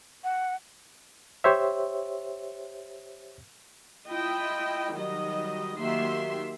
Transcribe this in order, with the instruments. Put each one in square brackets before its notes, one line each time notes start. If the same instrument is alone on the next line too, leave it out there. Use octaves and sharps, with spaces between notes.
[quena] F#5
[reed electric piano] G4 C5 C#5 E5
[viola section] E4 F4 D#5 G5
D#3 F#3 G3 D#5
D#3 F#3 A#3 G4 E5 C6